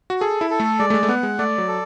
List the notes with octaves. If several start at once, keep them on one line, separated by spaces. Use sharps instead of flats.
F#4
G#4 A4
E4
A4
A3
G#3 D5
A3
G#3
A3
B3 F#5
G#3
A3 D5
F#3
A4